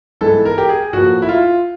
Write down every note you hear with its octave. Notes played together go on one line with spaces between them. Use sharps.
G#2 E3 G#3 B3 A4
A#4
G4
G#4
A2 F3 A#3 F#4
E4
F4